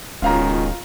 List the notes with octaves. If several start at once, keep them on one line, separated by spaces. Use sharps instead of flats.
D1 C#2 B2 D#3 C#4 F4 F5 A#5